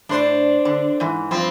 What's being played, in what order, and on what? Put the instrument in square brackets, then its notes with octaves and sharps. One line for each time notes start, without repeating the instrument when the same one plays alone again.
[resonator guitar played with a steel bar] A2 [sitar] D4 C5
[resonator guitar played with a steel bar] D3
G#2 E3
[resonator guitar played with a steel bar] G2 F3 [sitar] C4